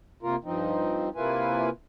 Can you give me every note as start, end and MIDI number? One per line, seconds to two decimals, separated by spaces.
0.23 0.36 48
0.23 0.36 58
0.23 0.36 65
0.23 0.36 70
0.44 1.09 43
0.44 1.09 53
0.44 1.09 60
0.44 1.09 63
1.16 1.69 48
1.16 1.69 58
1.16 1.69 64
1.16 1.69 65
1.16 1.69 71
1.16 1.69 80